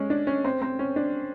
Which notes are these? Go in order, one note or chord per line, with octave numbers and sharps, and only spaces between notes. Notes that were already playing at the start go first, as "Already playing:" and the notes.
Already playing: G#3 C#4
D4
C#4
C4
C4
C#4
D4